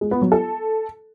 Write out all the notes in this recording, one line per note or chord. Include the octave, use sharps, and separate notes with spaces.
G#3
B3
F#3
A4